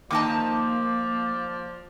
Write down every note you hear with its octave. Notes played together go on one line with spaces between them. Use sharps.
D#3 F3 A#3 D#4 D5 A5 D6